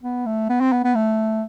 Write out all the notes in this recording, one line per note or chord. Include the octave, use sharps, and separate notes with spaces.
B3
A3
B3
C4
B3
B3
A3